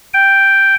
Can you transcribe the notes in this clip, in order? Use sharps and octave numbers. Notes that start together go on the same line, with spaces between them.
G5